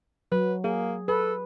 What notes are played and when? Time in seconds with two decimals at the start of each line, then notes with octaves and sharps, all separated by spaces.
0.32 F#3 B4
0.64 A#3 G#4
1.08 A4 B4